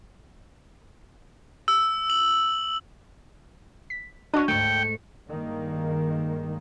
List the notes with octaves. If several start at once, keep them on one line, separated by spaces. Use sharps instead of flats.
E6
F#7
B6
C#4 D4 F#4 D#5 C#6 F#6
D2 G#2 A3 G5 C#7 D7
G2 D#3 G#3 A#3